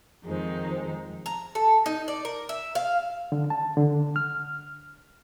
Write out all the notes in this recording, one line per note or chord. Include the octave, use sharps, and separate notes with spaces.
F2 D#3 F3 G#3 D#4 C5
A#5
A4
D#4
D5
A#4
E5
F5
D3
A5
D3
F6